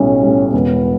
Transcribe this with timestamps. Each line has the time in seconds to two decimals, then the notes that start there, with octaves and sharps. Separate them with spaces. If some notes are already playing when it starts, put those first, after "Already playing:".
Already playing: B1 A2 G3 C#4
0.23 A2 G3
0.53 E1 B3